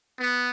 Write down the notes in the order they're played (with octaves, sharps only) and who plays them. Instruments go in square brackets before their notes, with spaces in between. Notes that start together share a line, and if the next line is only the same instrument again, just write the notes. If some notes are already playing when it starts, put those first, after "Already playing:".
[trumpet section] B3